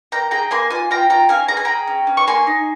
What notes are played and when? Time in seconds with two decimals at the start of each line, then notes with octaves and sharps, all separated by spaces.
0.12 A#3 G5 A#5
0.31 G#4 G5 A#5
0.51 A#3 G#5 C6
0.70 F4 G#5 C6
0.90 F4 G5 A#5
1.10 F4 G5 A#5
1.29 C#4 F5 G#5
1.48 G#4 A#5
1.57 G#5
1.65 G#4 G5 A#5
1.87 C#4
2.07 C#4
2.17 C#6
2.27 A#3 G#5 C6
2.47 D#4